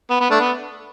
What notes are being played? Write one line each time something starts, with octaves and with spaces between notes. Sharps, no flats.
B3
B3
A3 D4
B3